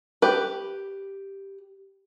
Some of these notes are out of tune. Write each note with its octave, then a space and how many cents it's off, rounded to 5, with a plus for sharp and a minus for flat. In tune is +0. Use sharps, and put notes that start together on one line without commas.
G4 +0 B4 +0